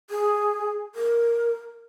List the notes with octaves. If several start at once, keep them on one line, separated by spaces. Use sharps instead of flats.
G#4
A#4